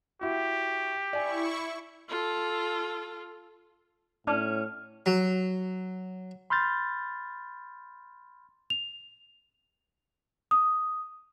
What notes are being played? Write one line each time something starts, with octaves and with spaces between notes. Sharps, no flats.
E4 F#4 G4
E4 D5 G#5 C#6
F4 A4
A2 C#4 D4 F6
F#3
B5 C6 F6 G6 A6
F7
D#6